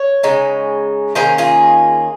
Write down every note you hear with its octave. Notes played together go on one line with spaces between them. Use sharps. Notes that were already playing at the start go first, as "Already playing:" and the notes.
Already playing: C#5
C#3 G#3 D#4
D#3 A#3 C#4 G#4 C5
F4 G#4